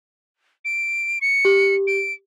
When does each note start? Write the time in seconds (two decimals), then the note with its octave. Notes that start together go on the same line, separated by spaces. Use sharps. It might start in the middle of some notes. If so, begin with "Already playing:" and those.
0.65 D7
1.21 C#7
1.45 G4
1.87 D7